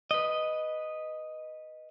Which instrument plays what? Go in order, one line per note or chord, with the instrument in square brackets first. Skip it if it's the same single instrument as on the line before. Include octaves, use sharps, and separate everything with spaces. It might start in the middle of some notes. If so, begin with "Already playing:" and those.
[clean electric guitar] B4 D#5